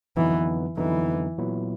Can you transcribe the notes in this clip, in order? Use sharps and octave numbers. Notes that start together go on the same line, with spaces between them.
F2 D3 E3 F#3 B3 D#4
F2 D3 E3 F#3 B3 D#4
A#2 F#3 B3 E4